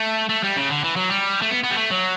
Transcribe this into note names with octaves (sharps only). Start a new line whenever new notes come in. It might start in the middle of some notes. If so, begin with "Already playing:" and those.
Already playing: A3
A3
G3
C#3
D3
E3
F#3
G3
A3
B3
B3
G3
A3
F#3